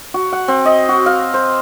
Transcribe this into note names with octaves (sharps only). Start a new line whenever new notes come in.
F#4
F#5
C4
D#5
F#4
F5
C5